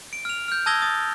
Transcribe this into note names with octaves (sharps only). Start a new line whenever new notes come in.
D7
F6 F7
F6 G6
A5 D#6 E6 G#6 A#6 G7
D#6 A6